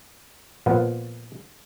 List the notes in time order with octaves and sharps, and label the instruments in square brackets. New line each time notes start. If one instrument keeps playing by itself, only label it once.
[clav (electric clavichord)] A#2 F3 B3 F#5